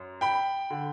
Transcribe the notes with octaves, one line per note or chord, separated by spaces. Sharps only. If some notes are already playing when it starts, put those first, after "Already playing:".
Already playing: F#2
G5 B5
D3